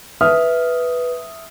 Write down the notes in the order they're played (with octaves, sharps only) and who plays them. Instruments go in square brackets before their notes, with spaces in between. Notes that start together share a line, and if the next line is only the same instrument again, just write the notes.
[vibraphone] B4 [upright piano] E5 D#6 F6